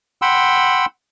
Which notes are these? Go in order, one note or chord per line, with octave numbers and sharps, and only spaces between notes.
F#5 G5 B5 C6 E6